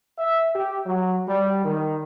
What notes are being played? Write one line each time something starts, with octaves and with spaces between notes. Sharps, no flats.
E5
G4
F#3
G3
D#3